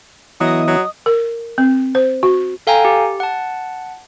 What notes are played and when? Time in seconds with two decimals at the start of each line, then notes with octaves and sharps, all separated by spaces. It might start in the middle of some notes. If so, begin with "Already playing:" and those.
0.40 E3 F#3 B3 E4 D#5 D#6
0.68 F#3
1.06 A#4
1.58 C4
1.95 C5
2.23 F#4
2.67 A4 F5 G5 G#5 A#5
2.85 G4
3.20 F#5 A5